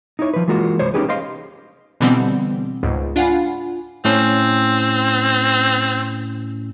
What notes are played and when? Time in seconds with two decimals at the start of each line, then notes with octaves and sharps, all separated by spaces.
0.19 D#4 E4 C#5
0.34 F3 B4
0.48 E3 G#3 A#3 F4 F#4
0.79 C2 C5 C#5
0.94 C#4 D#4 G4 G#4 B4
1.09 C5 D#5 F5 C6
2.00 B2 D3 E3 G3 B3 C4
2.83 C#2 G#2
3.16 D4 F4 F5 F#5 G#5 B5
4.05 A2 C4 C#4